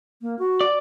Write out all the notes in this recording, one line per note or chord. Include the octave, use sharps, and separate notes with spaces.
A#3
F#4
D5